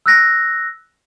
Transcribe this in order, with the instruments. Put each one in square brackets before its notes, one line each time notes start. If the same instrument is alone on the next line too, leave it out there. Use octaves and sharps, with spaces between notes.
[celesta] E6 F#6 A#6